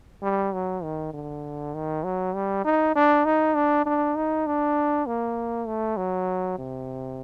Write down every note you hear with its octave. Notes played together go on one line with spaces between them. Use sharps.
G3
F#3
D#3
D3
D#3
F#3
G3
D#4
D4
D#4
D4
D4
D#4
D4
A#3
A3
F#3
C3